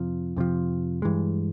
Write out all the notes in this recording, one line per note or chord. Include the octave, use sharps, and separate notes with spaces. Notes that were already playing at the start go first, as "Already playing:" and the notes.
Already playing: F2 C3 F3
F2 C3 F3
G2 E3 G#3